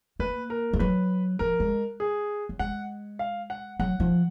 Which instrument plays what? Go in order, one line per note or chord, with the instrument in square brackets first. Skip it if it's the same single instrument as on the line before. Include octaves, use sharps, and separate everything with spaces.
[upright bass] A#3 [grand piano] B4
[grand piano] A#4
[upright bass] F3
[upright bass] F#3 [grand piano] B4
[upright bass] F3 [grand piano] A#4
[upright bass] G#3
[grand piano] G#4
[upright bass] F#3
[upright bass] G#3 [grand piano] F#5
[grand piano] F5
F#5
[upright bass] F#3 [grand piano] F#5
[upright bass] F3